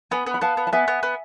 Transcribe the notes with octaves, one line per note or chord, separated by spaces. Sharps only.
B3 G#5 B5
B3
B5
B3 F5 A5
B3
A5
B3 E5 G#5
B3
B3